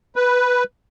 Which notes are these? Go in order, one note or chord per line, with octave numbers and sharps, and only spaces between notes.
B4